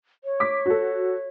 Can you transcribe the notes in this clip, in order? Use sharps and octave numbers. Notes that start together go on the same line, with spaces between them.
C#5
D6 B6
F#4 A4